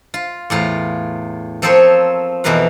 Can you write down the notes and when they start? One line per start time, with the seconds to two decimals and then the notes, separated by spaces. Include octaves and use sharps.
0.14 F4
0.50 E2 A2 F4 A#5
1.62 F3 C4 A4 A#4 C5 C#5
2.44 F2 B2 E3 A#4 B4 F5